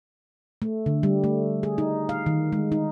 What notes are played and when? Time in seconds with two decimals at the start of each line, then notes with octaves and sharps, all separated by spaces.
0.62 A3
0.86 D3
1.03 G3
1.24 A3
1.63 G#4
1.78 D#4
2.09 F5
2.26 D#3
2.53 G#3
2.72 D#4